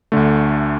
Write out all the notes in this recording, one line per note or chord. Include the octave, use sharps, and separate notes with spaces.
D2 D3 A3